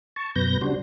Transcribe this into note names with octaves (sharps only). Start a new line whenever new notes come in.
A5 C#6
F#2 B2 B4 G6 A#6
C#3 G3 D4 F#4 C5